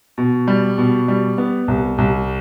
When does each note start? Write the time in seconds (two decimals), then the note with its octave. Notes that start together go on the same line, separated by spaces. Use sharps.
0.18 B2
0.48 G3
0.78 B2
1.08 G3
1.38 B3
1.68 C2
1.98 C2